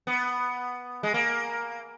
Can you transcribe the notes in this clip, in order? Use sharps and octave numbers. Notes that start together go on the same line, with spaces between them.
B3
G#3
A#3